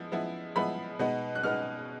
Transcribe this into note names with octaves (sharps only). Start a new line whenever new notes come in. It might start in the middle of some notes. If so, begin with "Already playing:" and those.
Already playing: F3 G#3 B3 E4
F3 G#3 B3 E4
F3 G#3 B3 E4 B5
B2 G#3 B3 D#4
F#6
B2 G#3 B3 D#4 F6